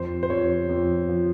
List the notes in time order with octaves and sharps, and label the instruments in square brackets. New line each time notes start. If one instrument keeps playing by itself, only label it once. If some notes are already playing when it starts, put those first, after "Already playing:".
Already playing: [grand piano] F2 C5
C5
F2 C#5
F2
F3